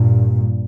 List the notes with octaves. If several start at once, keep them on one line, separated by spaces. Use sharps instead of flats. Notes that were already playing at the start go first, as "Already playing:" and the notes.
Already playing: G2 A#2